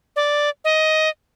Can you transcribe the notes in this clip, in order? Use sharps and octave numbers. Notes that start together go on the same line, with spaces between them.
D5
D#5